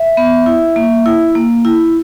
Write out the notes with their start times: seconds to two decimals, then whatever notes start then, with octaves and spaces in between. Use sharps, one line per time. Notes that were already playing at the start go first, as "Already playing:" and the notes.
Already playing: E5
0.17 B3
0.46 E4
0.76 A#3
1.06 E4
1.35 A#3
1.65 E4